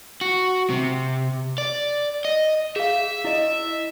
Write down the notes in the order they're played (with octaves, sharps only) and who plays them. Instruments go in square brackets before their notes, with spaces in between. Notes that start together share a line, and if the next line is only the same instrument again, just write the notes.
[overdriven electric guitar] F#4
C3
D5
D#5
[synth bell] G#4 F5 [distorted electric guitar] E5
[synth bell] E4 D#5